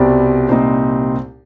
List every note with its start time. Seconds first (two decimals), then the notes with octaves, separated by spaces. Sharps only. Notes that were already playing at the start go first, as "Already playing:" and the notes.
Already playing: C2 B2 G3 C4 D5
0.49 C2 A#2 G3 C4 D#4 C5